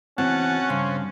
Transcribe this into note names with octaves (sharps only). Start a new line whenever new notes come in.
E2 G2 E3 C4 C#4 F#4 F#5 A5
G2 C#3 C4